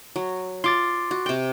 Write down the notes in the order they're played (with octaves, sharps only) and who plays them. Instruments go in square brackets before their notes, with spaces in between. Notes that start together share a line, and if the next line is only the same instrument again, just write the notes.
[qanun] F#3
[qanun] F4 [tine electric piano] C6 D6 A6
[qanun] F#4
C3 G5